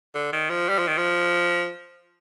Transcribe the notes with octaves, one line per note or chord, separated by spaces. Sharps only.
D3
D#3
F3
G3
F3
D#3
F3